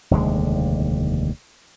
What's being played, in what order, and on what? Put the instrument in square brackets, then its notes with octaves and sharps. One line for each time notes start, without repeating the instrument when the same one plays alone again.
[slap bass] F1 D#2 D3 G#3